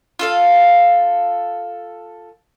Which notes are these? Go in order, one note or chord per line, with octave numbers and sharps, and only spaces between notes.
F4 A4 F5